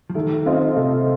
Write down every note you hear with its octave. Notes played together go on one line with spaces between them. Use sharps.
F3
D#3 A3
C4 F4 C5 D#5
C3 A3